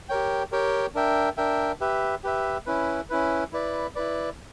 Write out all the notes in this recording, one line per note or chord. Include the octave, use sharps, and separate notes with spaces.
G4 A#4 C#5 G5
G4 A#4 C#5 G5
D4 A#4 E5 G5
D4 A#4 E5 G5
G4 B4 E5
G4 B4 E5
C#4 E4 B4
C#4 E4 B4
E4 B4 D5
E4 B4 D5